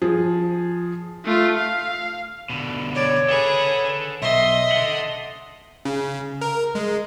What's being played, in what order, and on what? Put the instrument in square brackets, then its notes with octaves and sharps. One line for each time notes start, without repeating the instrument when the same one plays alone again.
[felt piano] F3 G#4
[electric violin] A3 F4
F5
[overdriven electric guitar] B2 D3
[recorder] C#5 [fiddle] D5
[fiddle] G#4 B4 [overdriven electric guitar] A4 F#5
[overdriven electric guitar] B1 [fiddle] D#5 C6 [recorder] E5
[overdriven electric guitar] A4 F#5
[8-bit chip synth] C#3
A#4
G#3